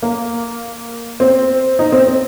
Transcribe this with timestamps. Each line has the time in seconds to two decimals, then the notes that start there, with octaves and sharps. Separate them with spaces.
0.02 A#3
1.20 C4
1.79 D#4
1.92 C4
2.07 C4